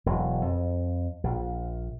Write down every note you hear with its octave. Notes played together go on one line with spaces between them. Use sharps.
E1 F#3
F2
A#1